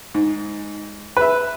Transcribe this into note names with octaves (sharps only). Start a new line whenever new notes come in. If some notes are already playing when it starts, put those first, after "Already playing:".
G#2
B4 E5